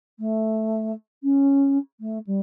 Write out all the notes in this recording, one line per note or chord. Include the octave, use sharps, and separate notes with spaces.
A3
C#4
A3
G3